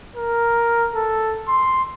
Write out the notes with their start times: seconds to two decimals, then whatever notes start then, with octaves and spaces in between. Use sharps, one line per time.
0.16 A#4
0.95 A4
1.48 C6